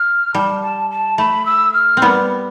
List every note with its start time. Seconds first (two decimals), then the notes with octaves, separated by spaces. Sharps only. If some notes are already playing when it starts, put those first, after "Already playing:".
Already playing: F6
0.34 G3 A5
0.63 A5
0.90 A5
1.18 A3 B5
1.46 E6
1.74 F6
1.97 C4
2.02 G3 B3